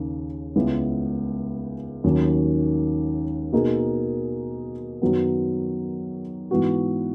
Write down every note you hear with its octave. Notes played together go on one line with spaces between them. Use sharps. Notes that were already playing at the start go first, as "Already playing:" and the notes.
Already playing: D#2 C#3 C#4
C#2 C#3 G#3 B3 E4
D#2 D#3 F#3 C#4
B2 A#3 D#4 G#4
F#2 D#3 F#3 B3
G#2 E3 B3 F#4